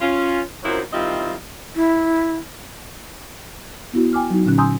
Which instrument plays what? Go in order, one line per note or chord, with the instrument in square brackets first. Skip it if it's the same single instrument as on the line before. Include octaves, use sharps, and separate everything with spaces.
[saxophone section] C#4 F4
F#2 D#3 F3 F#3 C4 E4
D#3 G3 C4 E4 F4 D#5
[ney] E4
[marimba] B3 E4 F#4
G5 G#5 D6 F6
F#3 D#4 F#4
A#2 D3 C#4 F#6
G#5 A#5 C6 D#6 E6 G6